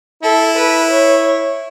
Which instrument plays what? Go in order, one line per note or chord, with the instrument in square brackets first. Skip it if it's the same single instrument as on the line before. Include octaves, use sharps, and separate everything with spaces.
[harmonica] E4 [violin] A4
[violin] B4
C#5